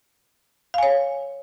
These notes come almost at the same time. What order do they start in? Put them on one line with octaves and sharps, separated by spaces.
F5 G#5 C#5